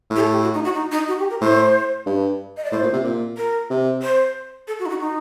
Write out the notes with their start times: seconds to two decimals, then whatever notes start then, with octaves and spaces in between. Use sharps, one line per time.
0.10 A2
0.16 G4
0.20 A4
0.32 G4
0.43 F#4
0.54 D#4
0.65 F#4
0.75 D#4
0.92 D#4
1.08 F#4
1.19 G4
1.30 A#4
1.41 A2 C5
2.06 G2
2.57 D#5
2.65 D5
2.72 A2 C5
2.83 A#2
2.93 C3
3.04 A#2
3.37 A#4
3.70 C3
4.02 C5
4.68 A4
4.79 F#4
4.86 D#4
4.90 F#4
5.00 D#4